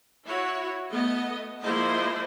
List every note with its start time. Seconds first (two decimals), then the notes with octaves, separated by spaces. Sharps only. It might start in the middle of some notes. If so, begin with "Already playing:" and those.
0.23 E4 F#4 C#5
0.90 A3 B3 D#5
1.60 F3 G#3 A#3 E4 C5 D#5